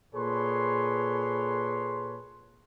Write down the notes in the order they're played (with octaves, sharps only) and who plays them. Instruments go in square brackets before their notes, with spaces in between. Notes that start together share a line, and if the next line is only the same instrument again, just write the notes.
[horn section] A#2 G#4 A4 B4 C#5 C6